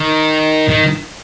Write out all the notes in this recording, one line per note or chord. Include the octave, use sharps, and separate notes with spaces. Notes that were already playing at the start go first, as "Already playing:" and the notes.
Already playing: D#3
D#3